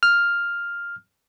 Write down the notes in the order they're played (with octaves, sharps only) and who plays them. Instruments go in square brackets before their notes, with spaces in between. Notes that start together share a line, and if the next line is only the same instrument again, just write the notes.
[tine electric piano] F6